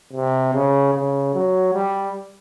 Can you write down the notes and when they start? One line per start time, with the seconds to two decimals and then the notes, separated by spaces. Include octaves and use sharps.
0.13 C3
0.54 C#3
0.94 C#3
1.34 F#3
1.74 G3